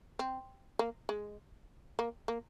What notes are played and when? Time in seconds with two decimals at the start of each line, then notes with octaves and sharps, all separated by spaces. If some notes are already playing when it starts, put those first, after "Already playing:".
0.19 C4
0.79 A#3
1.09 G#3
1.99 A#3
2.28 A#3